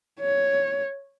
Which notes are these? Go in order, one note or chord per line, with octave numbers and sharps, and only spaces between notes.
C#5